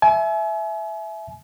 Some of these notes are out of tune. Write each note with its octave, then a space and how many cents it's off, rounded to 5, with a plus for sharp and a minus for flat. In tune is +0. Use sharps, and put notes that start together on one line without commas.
E5 +0 G#5 +40